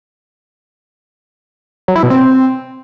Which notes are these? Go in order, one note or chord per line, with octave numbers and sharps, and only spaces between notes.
F#3
E4
B2
C4